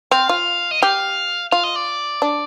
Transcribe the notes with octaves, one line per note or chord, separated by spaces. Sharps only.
C4 F5
F4
D#5
G4 F5
F4 F5
D#5
D5
D4